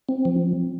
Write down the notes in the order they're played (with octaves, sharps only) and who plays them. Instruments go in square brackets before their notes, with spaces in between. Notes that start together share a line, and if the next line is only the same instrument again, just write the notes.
[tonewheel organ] C4
F3